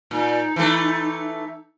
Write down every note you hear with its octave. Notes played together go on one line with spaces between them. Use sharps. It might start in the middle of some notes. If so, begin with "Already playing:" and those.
A#2 D#4
E3 A3